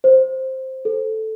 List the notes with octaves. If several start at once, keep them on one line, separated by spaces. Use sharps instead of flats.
C5
A4